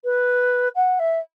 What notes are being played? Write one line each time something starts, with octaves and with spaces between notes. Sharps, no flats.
B4
F#5
E5